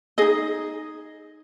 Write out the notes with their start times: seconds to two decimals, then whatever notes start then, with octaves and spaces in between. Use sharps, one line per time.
0.18 D#4 G#4 D#5